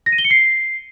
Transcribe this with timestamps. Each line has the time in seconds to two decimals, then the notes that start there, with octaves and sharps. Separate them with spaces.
0.06 A#6
0.12 D#7
0.18 G7
0.24 C#7
0.31 C7